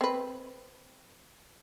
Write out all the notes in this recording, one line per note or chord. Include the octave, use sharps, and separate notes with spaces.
C4 B4